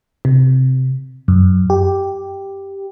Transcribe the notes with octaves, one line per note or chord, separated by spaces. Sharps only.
C3
F#2
G4